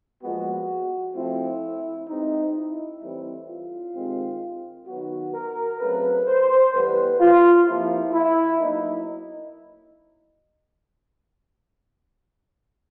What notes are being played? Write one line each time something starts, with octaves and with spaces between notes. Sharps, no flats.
A#2 F3 G#3 B3 F#4
A2 F3 A3 C4 E4
B2 G#3 C4 D#4
E4
A2 E3 G3 C4
F4
C3 D#3 G#3 C4
D#3 F#3 B3 F#4
A#4
C#3 F#3 A3 C4 B4
C5
A2 E3 G3 B3 B4
F4
C3 F3 A#3 E4
E4
B2 F#3 A#3 D#4